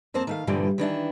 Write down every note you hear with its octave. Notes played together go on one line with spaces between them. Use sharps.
F2 A#3 C4 C5 A5
D#3 A3 F5
G2 A#2 D3 E3 F3 G3
D#3 E3 D4 E4